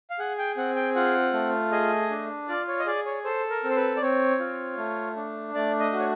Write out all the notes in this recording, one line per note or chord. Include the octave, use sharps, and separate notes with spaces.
F5
G#4 F#5
G5
C4 F#5
G5
F4 F#5
A3
G#4 D#5
D4
F4 D5
C#5
D#5
G#4 D5
C#5
A4 C5
A#4
C4
C5
B4
D5
C4 C#5
F4
A3
D4
A3 D5
D#5
F#4
C#5